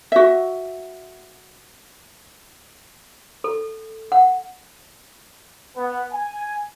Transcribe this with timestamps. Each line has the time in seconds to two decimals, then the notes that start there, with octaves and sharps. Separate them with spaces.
0.12 F#4 E5
3.44 A4
4.12 F#5
5.76 B3
6.12 G#5